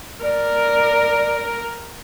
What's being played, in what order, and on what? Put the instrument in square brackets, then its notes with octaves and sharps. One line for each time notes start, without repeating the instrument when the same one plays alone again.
[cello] A#4 [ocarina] D5